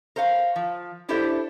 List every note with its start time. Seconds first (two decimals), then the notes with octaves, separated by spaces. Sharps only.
0.16 A#4 C5 C#5 F5
0.56 F3
1.09 D4 E4 G4 A4 C5 E5